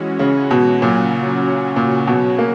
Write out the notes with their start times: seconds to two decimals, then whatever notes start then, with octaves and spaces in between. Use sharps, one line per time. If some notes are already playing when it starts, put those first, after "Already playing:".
Already playing: E3 G#3 C#4 F#4
0.19 C#3
0.51 B2
0.82 A#2 C#3 F#3 C#4 F#4
1.76 A#2
2.07 B2
2.38 A#3